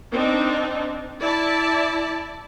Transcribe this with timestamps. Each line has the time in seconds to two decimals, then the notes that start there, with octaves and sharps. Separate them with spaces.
0.12 C4 D4 D#4
1.21 E4 D5 A5